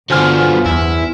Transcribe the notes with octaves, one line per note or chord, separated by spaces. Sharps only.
G2 D3 F#3 B3 F4 C5 G#5 F6
E2 E4